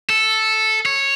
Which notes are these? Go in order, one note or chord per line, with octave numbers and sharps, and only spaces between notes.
A4
C#5